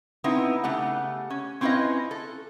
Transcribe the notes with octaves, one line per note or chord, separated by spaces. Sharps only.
B3 C4 D#4 E4
C#3 A3 G4 F#5
C#4
C4 C#4 E4 F4 B4 D#5
A4